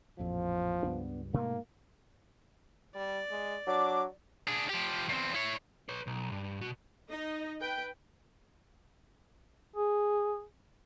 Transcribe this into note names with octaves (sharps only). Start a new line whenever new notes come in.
A1 F2 A#2 F3
C#2 G2 B3 D4
G#2 B2 A3 A#3
G3 D5
G#3
F#3 D4 D6
D4 G#4
F3 G4
E2 C4
E4 C#5
B4 C#5
B1
G2
B2 F#4
D#4 D#5
B4 G5
G#4